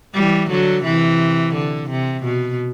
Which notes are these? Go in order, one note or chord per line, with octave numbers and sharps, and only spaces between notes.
E3 G3
D3 F#3
C3 E3
D3
C3
B2